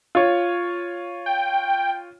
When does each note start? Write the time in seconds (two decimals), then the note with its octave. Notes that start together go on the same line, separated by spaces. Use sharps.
0.15 F4 C#5
1.26 G5